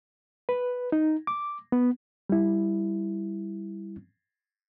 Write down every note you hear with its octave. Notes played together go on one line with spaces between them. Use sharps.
B4
D#4
D6
B3
G3 E4